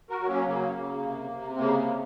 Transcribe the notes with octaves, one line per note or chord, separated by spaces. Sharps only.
F#4 A#4
F#3
A#3 C#4
C#3 A#3
C#3
C3
C3
C4
C#3 A#3
A#3
G#3